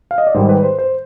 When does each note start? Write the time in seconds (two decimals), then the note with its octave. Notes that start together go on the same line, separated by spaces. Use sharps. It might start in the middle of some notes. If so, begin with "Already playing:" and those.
0.11 F5
0.18 D#5
0.27 D5
0.34 G#2 D#3 G3 C5
0.49 B4
0.63 C5
0.79 C5